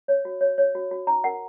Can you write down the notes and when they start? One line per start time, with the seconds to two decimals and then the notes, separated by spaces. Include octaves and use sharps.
0.08 C#5
0.25 F#4
0.41 C#5
0.58 C#5
0.75 F#4
0.91 F#4
1.07 D#4 A#5
1.24 A#4 F#5